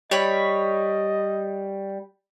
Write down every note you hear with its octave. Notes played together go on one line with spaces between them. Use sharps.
G3 C#5 D#5 B5